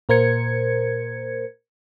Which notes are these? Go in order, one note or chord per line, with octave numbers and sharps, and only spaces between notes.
A#2 A#4 C5 G#6 C#7